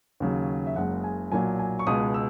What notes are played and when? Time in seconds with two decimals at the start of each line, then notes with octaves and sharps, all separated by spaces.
0.20 D#2 C#3 F#3
0.67 E5
0.76 F#1 F#2 C#3 G#3 F#5
1.04 G#5
1.32 B1 A#2 F#3 G#5
1.59 G#5
1.79 C#6
1.87 C#2 B2 G#3 D#6
2.14 E6